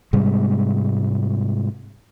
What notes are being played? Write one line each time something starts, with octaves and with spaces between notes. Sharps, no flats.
G#2 C3 G3 G#3